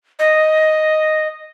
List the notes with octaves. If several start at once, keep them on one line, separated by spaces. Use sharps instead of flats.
D#5